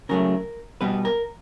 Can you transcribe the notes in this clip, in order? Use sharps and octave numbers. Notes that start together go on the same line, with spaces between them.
C#3 F#3 A3 A#4
B2 G3 B3 B4
A#4